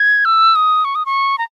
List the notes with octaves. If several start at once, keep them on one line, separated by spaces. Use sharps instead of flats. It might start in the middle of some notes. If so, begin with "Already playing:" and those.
Already playing: G#6
E6
D#6
C#6
D#6
C#6
A#5